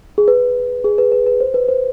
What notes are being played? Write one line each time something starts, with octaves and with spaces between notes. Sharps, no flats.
G#4
B4
G#4
B4
B4
B4
C5
B4
C5